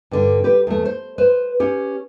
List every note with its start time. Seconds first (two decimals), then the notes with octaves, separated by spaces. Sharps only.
0.11 G2 D3
0.44 G4 B4
0.67 E2 A3
0.85 C5
1.18 B4 C5
1.60 C#4 G4